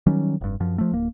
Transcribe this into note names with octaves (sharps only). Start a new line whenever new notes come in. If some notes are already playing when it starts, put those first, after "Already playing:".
D#3 F#3 G3 C#4
F1 G2
F#2 F3
F3 A3
D1 A#3